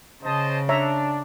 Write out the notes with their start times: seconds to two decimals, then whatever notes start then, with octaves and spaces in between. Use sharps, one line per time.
0.23 C#3 C5 D#5 A5
0.69 D4 C#5 E5 A#5